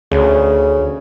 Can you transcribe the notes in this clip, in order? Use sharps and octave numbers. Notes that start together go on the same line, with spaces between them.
D2 C#3